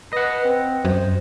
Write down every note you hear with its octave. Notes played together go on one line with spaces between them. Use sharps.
B4 D#5 F#5
C4
F#2 C5